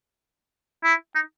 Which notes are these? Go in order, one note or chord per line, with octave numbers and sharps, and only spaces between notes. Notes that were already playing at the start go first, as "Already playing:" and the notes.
E4
D#4